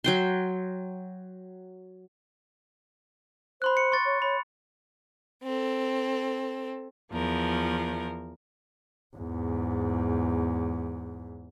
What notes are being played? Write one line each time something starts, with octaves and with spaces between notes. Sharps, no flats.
F#3 G5 C6
C5 B5 C6 F#6
C#7
C6 C#6 A6
C#5
C#5 B5
C4 A4
E2 F3 A#4
E2 G#2